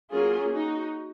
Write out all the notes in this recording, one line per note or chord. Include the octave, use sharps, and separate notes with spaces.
F#3 A#3 C#4 F4 G#4
D#4 F#4